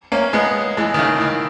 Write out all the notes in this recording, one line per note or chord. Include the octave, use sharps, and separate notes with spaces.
A#3 C#4
G#3 B3
E3 G#3
D#3
C#3
E3
D#3